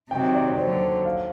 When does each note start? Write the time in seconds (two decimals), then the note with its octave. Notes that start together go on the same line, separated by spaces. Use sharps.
0.11 C3 D#3 F#3 G5
0.34 D5
0.47 C#5
0.58 D#2 D3 F#3 C5
1.05 F5